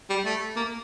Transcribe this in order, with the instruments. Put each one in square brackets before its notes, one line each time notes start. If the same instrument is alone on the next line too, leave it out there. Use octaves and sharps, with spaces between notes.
[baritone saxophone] G3
A3
A#3